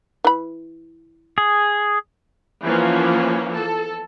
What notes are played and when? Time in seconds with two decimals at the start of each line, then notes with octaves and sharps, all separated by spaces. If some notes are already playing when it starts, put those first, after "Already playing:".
0.24 E3 B5
1.38 G#4
2.63 E3 F3 A#3 B3 C#4
3.53 A4